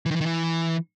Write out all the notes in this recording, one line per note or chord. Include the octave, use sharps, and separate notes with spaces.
E3
D#3
E3
D#3
E3